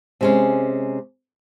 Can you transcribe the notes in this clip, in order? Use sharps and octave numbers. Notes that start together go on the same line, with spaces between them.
C3 G#3 C#4